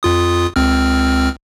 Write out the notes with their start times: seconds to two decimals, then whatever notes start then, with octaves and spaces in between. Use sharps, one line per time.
0.03 F2 F4 D#6
0.56 C#2 C4 F6